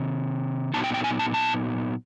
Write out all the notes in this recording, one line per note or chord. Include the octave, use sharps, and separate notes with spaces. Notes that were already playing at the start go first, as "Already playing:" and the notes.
Already playing: C3 D#3
A#2 F#3 B3 D#4 A5
G5
G5
G#5
A5
A5